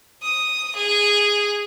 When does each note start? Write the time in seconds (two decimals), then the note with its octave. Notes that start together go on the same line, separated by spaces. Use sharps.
0.23 D#6
0.76 G#4